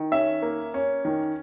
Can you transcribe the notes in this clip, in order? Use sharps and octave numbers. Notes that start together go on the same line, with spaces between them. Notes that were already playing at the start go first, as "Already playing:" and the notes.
Already playing: D#3
C#4 E5
A#3
C#4
D#3